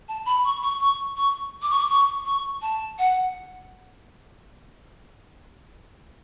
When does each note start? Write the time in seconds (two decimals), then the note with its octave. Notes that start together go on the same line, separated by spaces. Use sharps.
0.08 A5
0.26 B5
0.45 C#6
0.62 C#6
0.80 C#6
1.17 C#6
1.62 D6
1.70 C#6
1.79 D6
1.89 C#6
2.25 C#6
2.62 A5
2.99 F#5